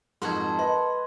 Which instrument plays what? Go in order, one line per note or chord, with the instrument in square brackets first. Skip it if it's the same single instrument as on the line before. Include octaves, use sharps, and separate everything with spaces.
[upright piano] F2 G#2 [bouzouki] F#4 A4 A#4 [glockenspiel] C6 F#6 G#6
[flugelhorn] B4 [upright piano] D#5 [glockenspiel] C6